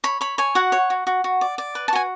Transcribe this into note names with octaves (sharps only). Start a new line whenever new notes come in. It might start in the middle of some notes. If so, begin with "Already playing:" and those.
C#5 B5
C#5 B5
C#5 G#5
F#4 F#5
C#5
F#4
F#4
F#4
D5
D5
B4
A5
F#4 G#5